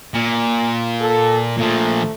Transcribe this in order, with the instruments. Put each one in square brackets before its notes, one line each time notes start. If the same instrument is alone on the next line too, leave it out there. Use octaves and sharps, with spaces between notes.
[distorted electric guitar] A#2
[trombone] A4
[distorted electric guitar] A#2 F3 [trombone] A3